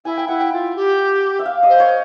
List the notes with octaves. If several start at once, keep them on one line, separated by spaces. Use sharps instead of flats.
E4 G#5
G5
E4 F#5
G5
F4
G4
E5
F5
D#5
C5
C#5